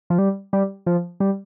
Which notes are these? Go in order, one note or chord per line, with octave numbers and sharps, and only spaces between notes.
F3
G3
G3
F3
G3